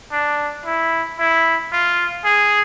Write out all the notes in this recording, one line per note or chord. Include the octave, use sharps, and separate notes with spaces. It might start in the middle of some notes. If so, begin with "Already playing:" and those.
D4
E4
E4
F4
G#4